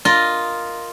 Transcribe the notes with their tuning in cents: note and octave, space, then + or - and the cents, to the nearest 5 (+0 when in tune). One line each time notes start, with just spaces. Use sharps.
F4 +0 A#4 +0 D#5 +0